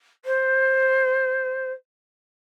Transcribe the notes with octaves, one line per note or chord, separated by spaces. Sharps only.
C5